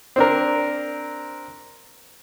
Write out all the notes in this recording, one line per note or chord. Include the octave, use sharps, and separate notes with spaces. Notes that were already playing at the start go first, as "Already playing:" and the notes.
C4 D4 A#4